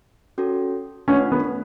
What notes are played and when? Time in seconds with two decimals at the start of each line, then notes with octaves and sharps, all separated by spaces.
0.38 C#4 F#4 A4
1.08 A3 C#4 D4 F4 B4 F#5
1.32 B3